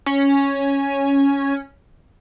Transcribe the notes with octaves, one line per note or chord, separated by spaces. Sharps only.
C#4